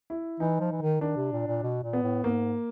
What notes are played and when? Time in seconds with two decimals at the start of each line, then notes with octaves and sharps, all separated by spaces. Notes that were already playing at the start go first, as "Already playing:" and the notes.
0.10 E4
0.40 E3 D#4
0.60 F3
0.72 E3
0.82 D#3
1.01 D#3 D4
1.16 C3
1.32 A#2
1.47 A#2
1.63 B2
1.83 A#2
1.93 B3
2.03 A2
2.24 G#2 A#3